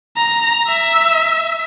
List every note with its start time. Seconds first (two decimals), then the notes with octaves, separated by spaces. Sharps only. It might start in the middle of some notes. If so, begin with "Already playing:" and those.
0.17 A#5
0.67 E5